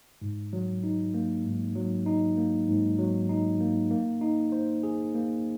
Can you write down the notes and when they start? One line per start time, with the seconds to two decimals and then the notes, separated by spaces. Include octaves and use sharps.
0.22 G#2
0.53 F#3
0.84 D#4
1.14 A#3
1.45 G#2
1.75 F#3
2.06 D#4
2.37 A#3
2.68 G#2
2.99 F#3
3.29 D#4
3.60 A#3
3.91 A#3
4.21 D#4
4.52 C5
4.83 G#4
5.14 A#3